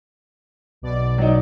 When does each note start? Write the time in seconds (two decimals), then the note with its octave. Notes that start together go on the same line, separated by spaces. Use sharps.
0.82 B1 B2 D5
1.18 F#3 D#4